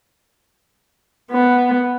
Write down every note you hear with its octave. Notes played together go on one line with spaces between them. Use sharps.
B3